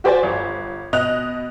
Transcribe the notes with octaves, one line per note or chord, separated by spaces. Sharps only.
F#4 G4 C5 D5 G#5
G1
B2 D#5 F#6 F7